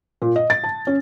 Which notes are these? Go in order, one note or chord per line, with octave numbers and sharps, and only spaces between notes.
A#2
D#5
A6
A5
C#4